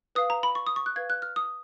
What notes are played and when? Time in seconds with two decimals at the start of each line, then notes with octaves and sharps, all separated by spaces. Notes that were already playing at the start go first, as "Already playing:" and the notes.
0.15 B4 F5 D#6
0.30 A#5
0.43 B5
0.55 C#6
0.67 D#6
0.76 C#6
0.86 F#6
0.96 B4 F5 G#6
1.10 F#6
1.22 F6
1.36 D#6